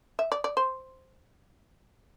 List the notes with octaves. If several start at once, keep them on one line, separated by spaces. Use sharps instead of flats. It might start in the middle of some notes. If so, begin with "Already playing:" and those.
E5
D5
D5
C5